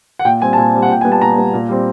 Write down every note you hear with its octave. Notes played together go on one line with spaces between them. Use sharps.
F#5
A#2 G5
G3 C4 G#5
A5
A#2 G#5
G3 C4
F#5
A#2 G5
G3 B3 G#5
A5
A#2 A#5
G3 B3
A#2
G3 C4